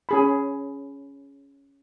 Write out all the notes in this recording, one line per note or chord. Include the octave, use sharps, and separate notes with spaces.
C#4 G#4 B5